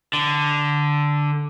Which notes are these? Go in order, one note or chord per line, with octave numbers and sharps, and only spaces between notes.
D3